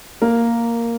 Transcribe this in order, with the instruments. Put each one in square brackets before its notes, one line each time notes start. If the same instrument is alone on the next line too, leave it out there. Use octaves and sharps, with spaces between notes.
[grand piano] A#3 A#4